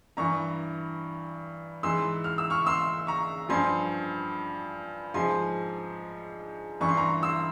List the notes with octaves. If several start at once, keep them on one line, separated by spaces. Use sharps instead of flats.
G2 E3 A#5 C#6
G#2 E3 C6 E6
F6
E6
C#6 F6
C6 E6
A#5 C#6
G2 F3 G#5 C6
G#2 F3 G#5 C6
G2 E3 C#6
C6
A#5 C#6
C6 E6